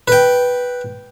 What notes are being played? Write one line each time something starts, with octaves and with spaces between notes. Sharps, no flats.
B4 G5